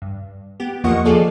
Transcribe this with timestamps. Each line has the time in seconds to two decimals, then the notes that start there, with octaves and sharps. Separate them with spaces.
0.02 G2
0.60 B3 G4
0.84 E2 F3 A#3 D#5 F#5 C#6
1.05 F3 F4 G#4 A4 D5